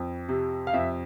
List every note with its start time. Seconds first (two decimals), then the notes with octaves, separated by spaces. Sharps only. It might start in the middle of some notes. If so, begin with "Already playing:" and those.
Already playing: F2
0.29 C3
0.67 F5
0.73 F2 E5